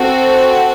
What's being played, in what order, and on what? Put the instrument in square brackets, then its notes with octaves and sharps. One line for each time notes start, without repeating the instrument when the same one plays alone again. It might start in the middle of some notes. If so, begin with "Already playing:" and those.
Already playing: [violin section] C4 F#4 A4